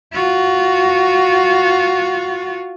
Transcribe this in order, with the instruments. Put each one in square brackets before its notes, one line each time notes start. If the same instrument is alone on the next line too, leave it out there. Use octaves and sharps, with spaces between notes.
[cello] F4 F#4